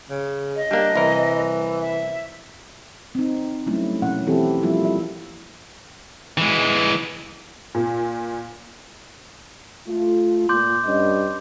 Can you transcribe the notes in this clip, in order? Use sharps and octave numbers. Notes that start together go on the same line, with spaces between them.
C#3
D#5
G3 A#3 D4
C2 E3 A#4
E5
C4 D#4
F#3 G3 A3 C#4 E4
B2 F3 A#3 C#4 F#5
E3 C4 E4 G4 A4
F3 G3 A#3 E4 F4
E5
E3 G#3
A#2
A3 F4
A#2 C6 D6 G6
G2 C#4 D#5